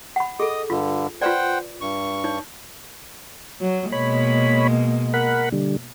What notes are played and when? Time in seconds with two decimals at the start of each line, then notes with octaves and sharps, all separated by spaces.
0.16 F#5 B5
0.40 G#4 A4 D#5 D#6
0.70 G2 D3 F4
1.22 F4 B4 C5 D5 F#5 G5
1.81 G2 C#6
2.24 D#4 C#5
3.61 F#3
3.92 B2 G#3 A#3 C#5 B5
5.14 A#4 F#5 B5
5.52 D3 G3